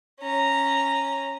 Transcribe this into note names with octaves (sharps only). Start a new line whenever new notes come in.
C#4 A#5